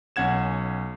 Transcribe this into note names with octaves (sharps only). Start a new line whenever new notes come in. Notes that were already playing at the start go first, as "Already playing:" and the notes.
B1 C#4 F#5 G#6 E7